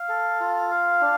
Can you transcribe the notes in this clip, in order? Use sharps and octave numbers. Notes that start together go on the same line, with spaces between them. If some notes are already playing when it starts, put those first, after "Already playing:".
Already playing: F5
A4
F4
F5
D4